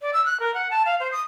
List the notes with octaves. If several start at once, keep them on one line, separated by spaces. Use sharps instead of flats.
D5
E6
F#6
A#4
F#5
A5
F5
C5
D#6